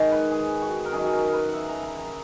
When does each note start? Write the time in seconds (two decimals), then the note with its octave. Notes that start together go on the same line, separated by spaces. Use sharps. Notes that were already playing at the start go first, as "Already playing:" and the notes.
Already playing: G#2 D#3 G#3 C#5
0.11 B4
0.31 G#4
0.62 F#4
0.85 A#4
0.92 F#2 D#3 F#3 G#4
1.07 G#4
1.13 A#4
1.28 A#4 B4
1.49 E5 F#5
1.68 A#5
1.83 A#5
1.98 A#5